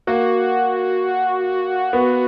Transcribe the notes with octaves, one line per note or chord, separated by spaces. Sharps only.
A#3 F#4
B3